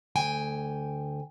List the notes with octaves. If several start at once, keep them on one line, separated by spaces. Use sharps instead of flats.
D2 G5 G#5